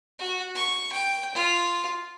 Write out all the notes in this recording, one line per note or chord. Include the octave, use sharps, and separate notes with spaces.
F#4
C#6
G5
F4